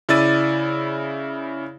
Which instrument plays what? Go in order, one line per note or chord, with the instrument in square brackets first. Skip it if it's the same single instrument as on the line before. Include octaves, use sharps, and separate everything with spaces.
[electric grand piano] C#3 E4 D5 E6 A6 D#7